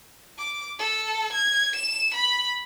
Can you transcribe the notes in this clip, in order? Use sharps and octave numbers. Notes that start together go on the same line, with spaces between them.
D6
A4
G#6
E7
B5